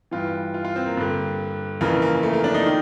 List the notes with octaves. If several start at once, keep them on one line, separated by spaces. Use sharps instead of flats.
G2 E3 F4
F4
F4
C4
A#3
G2 D3
F2 C#3 E3 A#3
A#3
A3
A#3
D4
D#4
D#3